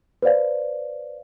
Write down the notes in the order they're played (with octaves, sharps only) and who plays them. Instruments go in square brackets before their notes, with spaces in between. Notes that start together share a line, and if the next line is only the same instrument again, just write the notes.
[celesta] B4 C5 D5 F5